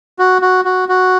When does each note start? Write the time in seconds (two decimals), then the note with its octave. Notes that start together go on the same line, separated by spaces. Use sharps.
0.19 F#4
0.42 F#4
0.65 F#4
0.89 F#4